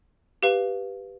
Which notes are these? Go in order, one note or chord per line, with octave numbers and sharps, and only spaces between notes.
G4 B4 F5